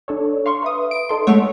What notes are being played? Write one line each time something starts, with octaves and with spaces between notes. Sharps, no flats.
D4 A4 C#5
F5 C6 C#6
B4 E5 D#6
D7
D#4 A4 C6
G#3 A3 C#5 F#5